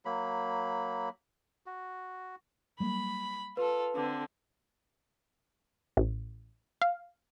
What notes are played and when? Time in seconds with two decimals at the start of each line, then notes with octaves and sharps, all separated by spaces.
0.05 F#3 A#3 B5
1.66 F#4
2.80 F#3 G3 A#3 B5
3.57 F4 A4 B4
3.95 D3 C4
5.97 A1
6.82 F5